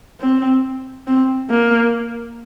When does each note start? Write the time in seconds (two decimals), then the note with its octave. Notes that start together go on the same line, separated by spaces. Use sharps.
0.20 C4
1.07 C4
1.50 A#3